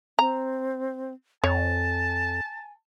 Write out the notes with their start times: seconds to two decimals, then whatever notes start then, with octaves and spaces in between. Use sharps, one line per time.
0.19 C4 A#5
1.44 F2 C#5 G#5 A5